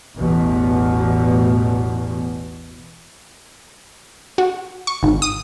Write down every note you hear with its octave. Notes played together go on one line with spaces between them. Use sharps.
A1 E2 B2
F#4
C#6
G#1
D#6